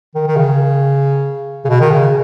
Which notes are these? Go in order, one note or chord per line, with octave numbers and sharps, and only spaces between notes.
D#3
D#3
C#3
C#3
B2
D#3
C#3